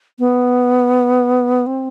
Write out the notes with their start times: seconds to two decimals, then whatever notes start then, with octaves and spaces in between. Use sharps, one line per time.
0.19 B3
1.66 C4